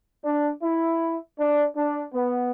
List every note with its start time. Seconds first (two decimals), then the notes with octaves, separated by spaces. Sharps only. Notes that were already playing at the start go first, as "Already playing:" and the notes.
0.24 D4
0.63 E4
1.38 D4
1.76 D4
2.14 B3